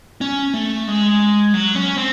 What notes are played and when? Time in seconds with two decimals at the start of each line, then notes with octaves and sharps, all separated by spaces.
0.21 C#4
0.53 A3
0.87 G#3
1.54 F#3
1.75 C#4
1.98 C4